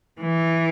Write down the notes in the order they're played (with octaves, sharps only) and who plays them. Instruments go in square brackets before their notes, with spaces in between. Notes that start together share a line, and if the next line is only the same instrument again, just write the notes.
[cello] E3